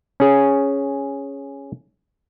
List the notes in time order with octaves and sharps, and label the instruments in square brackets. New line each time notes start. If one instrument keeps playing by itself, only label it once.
[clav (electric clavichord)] C#4 G#4